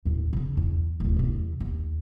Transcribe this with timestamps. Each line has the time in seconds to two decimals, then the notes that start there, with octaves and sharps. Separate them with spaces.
0.05 D#2 A2
0.33 C#3 D4
0.57 E2
1.00 D1 D2
1.16 E2 C3
1.60 D#2